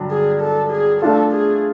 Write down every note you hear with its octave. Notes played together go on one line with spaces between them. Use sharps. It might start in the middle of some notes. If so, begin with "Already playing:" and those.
Already playing: G2 D3 F#3 D4
G#4
A4
G#4
A3 D4 F4 A4
G#4